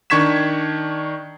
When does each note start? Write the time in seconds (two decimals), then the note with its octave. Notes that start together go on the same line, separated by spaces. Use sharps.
0.10 D#3 D4 C#6 G#6 B6 E7